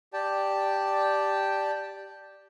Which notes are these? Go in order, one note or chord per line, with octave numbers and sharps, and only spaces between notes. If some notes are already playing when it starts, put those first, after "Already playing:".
G4 D5 G5 A5